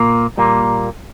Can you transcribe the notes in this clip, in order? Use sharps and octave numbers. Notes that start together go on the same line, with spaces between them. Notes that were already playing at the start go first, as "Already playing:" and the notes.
Already playing: A#2 A#3
A#2 G3 A#3